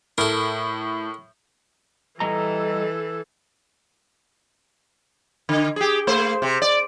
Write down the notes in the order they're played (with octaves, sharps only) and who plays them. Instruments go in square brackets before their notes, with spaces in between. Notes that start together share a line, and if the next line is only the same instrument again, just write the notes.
[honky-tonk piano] A2 [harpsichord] A4 A#4
[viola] E3 A4 [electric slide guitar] G3 D#5 A#5
[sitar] D3
G4 G#4
A3 C5
C3
D5